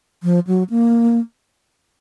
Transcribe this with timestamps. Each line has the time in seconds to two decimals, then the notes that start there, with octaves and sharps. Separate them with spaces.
0.23 F3
0.47 F#3
0.70 A#3